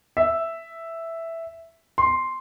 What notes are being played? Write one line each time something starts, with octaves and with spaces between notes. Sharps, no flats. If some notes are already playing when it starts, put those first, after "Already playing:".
E5
C6